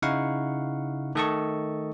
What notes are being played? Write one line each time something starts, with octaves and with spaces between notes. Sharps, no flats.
C#3 D#4 E4 F5 F#5 C#6
D#3 A3 A4 D#5 A5 C#6